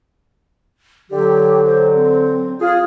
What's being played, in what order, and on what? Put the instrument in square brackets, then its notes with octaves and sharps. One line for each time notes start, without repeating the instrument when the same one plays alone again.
[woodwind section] D3 F#3 [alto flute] G4
[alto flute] C5
C4
[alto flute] F4 [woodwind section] G#4